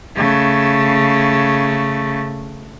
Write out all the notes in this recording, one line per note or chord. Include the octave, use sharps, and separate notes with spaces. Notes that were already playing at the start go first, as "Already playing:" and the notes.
C#3 A3